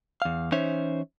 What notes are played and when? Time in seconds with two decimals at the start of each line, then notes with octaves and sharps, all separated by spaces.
0.22 E2 F5
0.52 E3 C#4 D#4 C5 C#5 E5